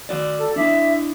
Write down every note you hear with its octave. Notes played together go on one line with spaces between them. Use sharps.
F#4 D5
A4
D4 E4 E5